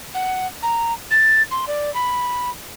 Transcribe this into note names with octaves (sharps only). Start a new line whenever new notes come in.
F#5
A#5
A6
C6
D5
B5